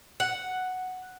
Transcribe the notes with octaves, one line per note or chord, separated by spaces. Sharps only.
F#5